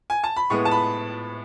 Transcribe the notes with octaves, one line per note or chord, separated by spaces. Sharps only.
G#5
A5
B5
A2 G#3 B3 C#6
A5
B5